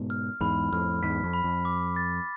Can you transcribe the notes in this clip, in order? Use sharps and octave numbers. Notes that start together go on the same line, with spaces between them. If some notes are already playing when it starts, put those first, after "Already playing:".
Already playing: G#2 B2
F6
E2 G#2 B5
F2 A2 F6
E2 G#2 B6
F2
B5
F2
D6
A6